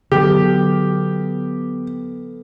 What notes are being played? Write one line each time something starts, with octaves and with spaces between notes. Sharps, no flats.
D3 F#3 B3 G4 A4 B4